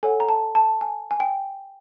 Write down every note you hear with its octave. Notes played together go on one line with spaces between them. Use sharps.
A4 C#5 F#5 G#5
A#5
A5
A5
G#5
G#5
G5